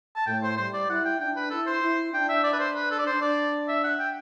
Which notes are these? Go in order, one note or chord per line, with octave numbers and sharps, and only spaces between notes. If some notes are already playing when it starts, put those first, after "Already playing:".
A5
A2 G5
C5
G3 C5
D5
E4 F#5
G5
D4 G5
B4
E4 A4
C5
E4
D4 G5
E5
D5
B4
C5
B4
A4
D5
D4 C5
D5
E5
F#5
G5